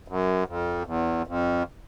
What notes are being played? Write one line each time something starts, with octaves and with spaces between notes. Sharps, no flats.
F#2
F2
E2
F2